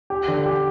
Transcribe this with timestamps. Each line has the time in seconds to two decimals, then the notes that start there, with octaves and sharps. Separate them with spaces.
0.10 G4
0.28 D3
0.46 G4